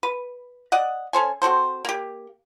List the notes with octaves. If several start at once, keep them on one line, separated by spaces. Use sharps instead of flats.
B4
D5 D#5 F#5
C#4 A4 C5 G#5
C4 F#4 A4 C5
A#3 G4